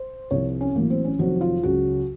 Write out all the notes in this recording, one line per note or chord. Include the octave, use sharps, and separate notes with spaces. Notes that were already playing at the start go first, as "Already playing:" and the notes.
Already playing: C5
C2 C3 F3 C#5
C#4
A1 A2 F#3 A#3
C4
C#4
F1 F2 D#3 F#3 F#4
F4
C#2 C#3 F#3 F#4